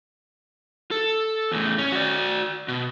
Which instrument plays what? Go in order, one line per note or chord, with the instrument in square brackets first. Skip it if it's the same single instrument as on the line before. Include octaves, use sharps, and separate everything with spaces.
[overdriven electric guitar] A4
E2 A2
C#4
F#4 D5
B2